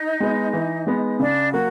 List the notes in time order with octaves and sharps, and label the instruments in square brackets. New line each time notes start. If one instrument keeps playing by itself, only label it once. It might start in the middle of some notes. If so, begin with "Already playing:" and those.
Already playing: [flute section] D#4
[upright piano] G#3 B3
E3
G#3 B3
[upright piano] C#3 [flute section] D4
[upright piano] F#3 A#3 [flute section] F#4